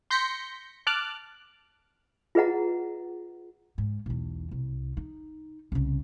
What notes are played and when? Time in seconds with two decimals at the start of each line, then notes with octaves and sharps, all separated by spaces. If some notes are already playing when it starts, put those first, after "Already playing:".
0.11 C6 G6 A#6 B6 C#7
0.87 A5 D6 F6 F#6
2.35 F4 G#4 B4 D#5 F#5 A#5
3.78 G#2
4.06 B1 E2
4.51 C2
4.97 D#4
5.72 C2 C#3